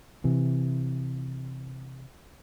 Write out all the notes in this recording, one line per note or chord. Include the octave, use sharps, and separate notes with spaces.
C3 E3